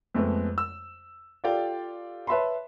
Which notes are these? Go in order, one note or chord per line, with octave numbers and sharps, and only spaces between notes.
F2 G#3 A3 B3
E6
F4 G4 A4 D5 F5 G5
B4 C#5 E5 A5 B5 C6